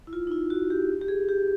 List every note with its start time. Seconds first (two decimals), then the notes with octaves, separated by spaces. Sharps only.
0.07 E4
0.13 F4
0.27 D#4
0.32 E4
0.50 F#4
0.70 G4
1.01 G4
1.08 G#4
1.29 G4